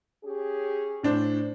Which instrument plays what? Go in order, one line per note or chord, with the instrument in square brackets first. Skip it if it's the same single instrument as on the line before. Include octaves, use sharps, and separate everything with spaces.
[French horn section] C#4 G4 G#4
[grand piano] A2 D4 C5